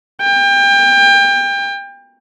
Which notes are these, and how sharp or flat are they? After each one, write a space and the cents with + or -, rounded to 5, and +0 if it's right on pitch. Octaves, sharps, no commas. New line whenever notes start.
G5 +30